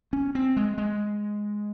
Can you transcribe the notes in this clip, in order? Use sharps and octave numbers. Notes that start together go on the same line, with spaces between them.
C#4
C4
G#3
G#3